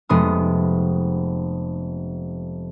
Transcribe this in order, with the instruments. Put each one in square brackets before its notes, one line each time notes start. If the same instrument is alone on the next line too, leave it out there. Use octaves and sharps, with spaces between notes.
[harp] F1 G#3 B3 C6 D#6